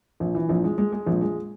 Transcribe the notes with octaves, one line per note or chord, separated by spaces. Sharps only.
A#1
E3
A#1
G#3
G#3
G#3
A#1
G#3